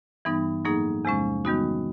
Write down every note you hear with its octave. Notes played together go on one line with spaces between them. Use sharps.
G2 E3 G3 B3 D#4
A2 F#3 A#3 D#4 G#4
E2 C3 F3 G#3 C#4
D#3 G3 B3 D#4 F#4